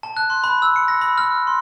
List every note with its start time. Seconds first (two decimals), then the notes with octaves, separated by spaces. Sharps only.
0.03 A5
0.17 F#6
0.30 C6
0.44 B5
0.62 E6
0.76 C#7
0.88 A#6
1.01 B5
1.18 F6
1.47 C6